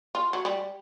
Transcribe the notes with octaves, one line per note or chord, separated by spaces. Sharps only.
F4
F#3
G3